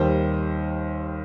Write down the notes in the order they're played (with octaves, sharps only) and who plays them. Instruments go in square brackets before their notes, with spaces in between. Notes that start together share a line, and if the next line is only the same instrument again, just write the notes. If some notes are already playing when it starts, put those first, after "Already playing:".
Already playing: [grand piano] D#2 D#3 G3 C5